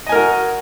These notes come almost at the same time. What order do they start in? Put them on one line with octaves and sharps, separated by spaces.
D#5 G#5 A#4 F#4